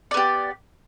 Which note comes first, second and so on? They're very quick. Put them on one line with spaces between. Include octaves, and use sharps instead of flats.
D5 B3 G4